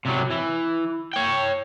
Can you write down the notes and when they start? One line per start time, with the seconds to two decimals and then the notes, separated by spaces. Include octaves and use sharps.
0.05 C3 F#3
0.30 E3
1.14 C#5 G5